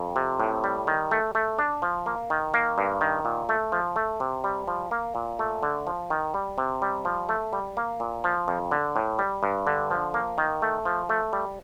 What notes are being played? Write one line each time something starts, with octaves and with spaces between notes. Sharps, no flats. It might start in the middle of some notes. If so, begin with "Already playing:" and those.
Already playing: F2
C3
A2
G3
D#3
A3
A3
D4
F3
A#3
D#3
A#3
G2
D#3
A#2
A3
F3
A3
C3
G3
F3
A#3
A#2
A3
D3
F3
D#3
G3
C3
G3
F3
A3
G3
A#3
A#2
F3
F2
D3
A2
G3
G2
D3
F3
A#3
D#3
A3
F3
A3
G3